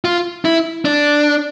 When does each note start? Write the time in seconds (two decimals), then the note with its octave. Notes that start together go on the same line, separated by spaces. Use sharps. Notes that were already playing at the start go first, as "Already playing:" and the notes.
0.05 F4
0.45 E4
0.85 D4